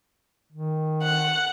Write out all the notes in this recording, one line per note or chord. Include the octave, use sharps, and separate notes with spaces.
D#3
F#5